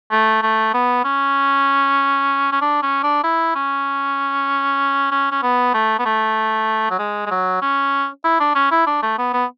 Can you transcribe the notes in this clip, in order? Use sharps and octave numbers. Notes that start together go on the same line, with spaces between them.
A3
A3
B3
C#4
C#4
D4
C#4
D4
E4
C#4
C#4
C#4
B3
A3
B3
A3
F#3
G#3
G#3
F#3
C#4
E4
D4
C#4
E4
D4
A3
B3
B3